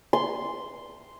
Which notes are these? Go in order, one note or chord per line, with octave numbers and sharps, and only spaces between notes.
C6